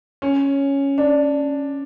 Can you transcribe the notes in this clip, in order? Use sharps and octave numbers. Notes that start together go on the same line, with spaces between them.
C#4
D4